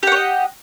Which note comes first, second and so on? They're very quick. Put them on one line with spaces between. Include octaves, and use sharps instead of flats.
G4 F#5 C#5 D#5